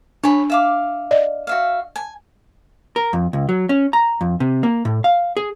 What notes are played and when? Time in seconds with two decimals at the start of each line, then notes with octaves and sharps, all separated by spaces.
0.24 D4 C#5 G#5 B5
0.50 E5 F5 D6
1.11 D5 D#5
1.47 F#4 E5 F5
1.96 G#5
2.96 A#4
3.13 F2
3.33 C#2
3.49 F#3
3.69 C#4
3.93 A#5
4.21 F2
4.40 C3
4.63 A#3
4.85 A2
5.04 F5
5.37 G#4